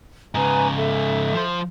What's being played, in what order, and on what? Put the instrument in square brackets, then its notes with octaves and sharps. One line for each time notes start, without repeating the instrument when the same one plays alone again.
[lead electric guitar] G#2 C#3 [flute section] B4 G#5 A#5
[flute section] A4 E5
[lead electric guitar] F3 C5